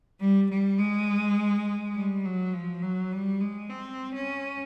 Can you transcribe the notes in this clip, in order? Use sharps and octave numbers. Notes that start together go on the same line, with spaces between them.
G3
G3
G#3
G3
F#3
F3
F#3
G3
G#3
C4
C#4